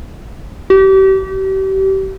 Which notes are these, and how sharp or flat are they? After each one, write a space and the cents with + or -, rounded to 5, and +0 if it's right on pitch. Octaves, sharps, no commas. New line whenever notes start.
G4 -35